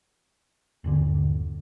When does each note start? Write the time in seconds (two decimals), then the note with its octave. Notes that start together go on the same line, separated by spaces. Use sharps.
0.84 D#1 G2 D3